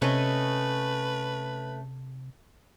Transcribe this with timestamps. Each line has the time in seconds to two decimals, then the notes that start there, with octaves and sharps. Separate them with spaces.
0.02 C3 A3 C#4 B4 D#5